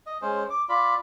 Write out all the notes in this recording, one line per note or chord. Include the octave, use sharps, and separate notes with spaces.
D#5
G#3 C#4 C5
D6
F4 D5 B5